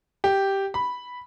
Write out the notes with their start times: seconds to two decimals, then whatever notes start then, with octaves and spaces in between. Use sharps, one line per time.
0.24 G4
0.74 B5